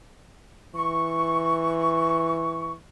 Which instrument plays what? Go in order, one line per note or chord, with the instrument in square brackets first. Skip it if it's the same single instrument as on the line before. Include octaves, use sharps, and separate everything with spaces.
[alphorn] E3 [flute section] C#6